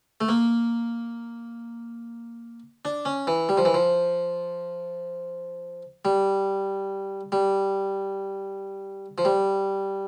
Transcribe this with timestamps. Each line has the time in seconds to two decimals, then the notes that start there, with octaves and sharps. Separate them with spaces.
0.21 A3
0.29 A#3
2.85 D4
3.05 C#4
3.27 E3
3.49 G3
3.57 F3
3.65 E3
3.74 F3
6.05 G3
7.32 G3
9.18 F3
9.25 G3